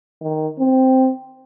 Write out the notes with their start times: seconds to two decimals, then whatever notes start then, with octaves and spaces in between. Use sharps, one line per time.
0.22 D#3
0.59 C4